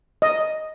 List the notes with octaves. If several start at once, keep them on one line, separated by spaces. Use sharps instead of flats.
D#5